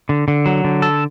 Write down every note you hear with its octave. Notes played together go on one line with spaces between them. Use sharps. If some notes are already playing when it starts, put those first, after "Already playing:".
D3
D3
F#3
D3
A4